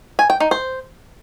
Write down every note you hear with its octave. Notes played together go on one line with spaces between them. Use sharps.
G#5
G5
D#4
C5